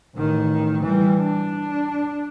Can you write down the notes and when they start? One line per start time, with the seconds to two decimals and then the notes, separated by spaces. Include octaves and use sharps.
0.17 A1 D#3
0.83 E3 G3
1.19 D4